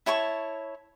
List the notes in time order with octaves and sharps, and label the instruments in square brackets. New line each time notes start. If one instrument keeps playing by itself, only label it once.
[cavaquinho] E4 C#5 A5 C#6